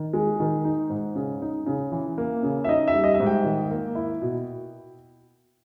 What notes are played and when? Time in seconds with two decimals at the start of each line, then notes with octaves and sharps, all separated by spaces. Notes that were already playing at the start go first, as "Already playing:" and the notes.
Already playing: D#3
0.13 G#3
0.40 D#3
0.65 D#4
0.90 G#2
1.15 C#3
1.42 D#4
1.66 C#3
1.92 E3
2.18 A#3
2.43 C#3
2.64 E5
2.68 D#4 D#5
2.88 E5
2.94 G3
3.04 D#5
3.14 E5
3.20 G#2
3.26 G5
3.44 D#3
3.71 A#3
3.95 E4
4.22 B2